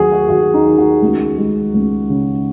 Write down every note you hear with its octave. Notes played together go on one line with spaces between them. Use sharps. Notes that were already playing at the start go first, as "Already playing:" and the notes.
Already playing: D#2 F#3 F#4 G#4
F#4
D#2 F#4
D#4
D#3
F#4
C#2
G#3
C#2
C#3